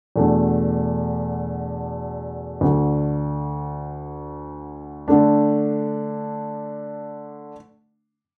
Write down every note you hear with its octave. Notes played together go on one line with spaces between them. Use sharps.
E2 B2 A3 D4
D2 D3 A3
D3 A3 D4